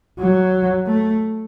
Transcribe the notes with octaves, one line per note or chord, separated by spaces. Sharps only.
F#3
A3